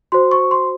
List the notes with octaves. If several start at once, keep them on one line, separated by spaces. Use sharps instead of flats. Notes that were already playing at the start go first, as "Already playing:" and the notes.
F#4 C5 C6
C#6
C6